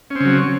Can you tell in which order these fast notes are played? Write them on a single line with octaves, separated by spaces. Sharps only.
C#4 C4 C#3 F#3